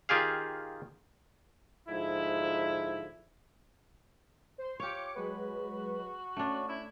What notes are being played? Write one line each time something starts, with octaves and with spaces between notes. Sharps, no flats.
D#3 F4 G4 G#4 F5
G#2 D3 F3 E4
C5 C6
F4 G4 C#5 D6 C#7
F#3 G#3 F#4 B4
A3 C#4 D4
E4